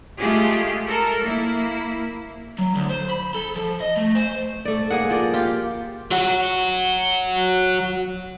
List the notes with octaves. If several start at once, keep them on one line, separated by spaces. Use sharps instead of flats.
G#3 A3 F4 G4 G#4
A4 A#4
A#3 E4
F#3
D2
C5
B5
A4
F3
D#5
A3
C5
A3 D5
A#3 G#4 F#5
F3 D5
F4 G4
F#3 F#4